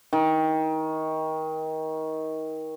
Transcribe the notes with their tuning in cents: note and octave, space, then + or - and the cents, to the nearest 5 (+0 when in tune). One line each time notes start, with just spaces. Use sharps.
D#3 +25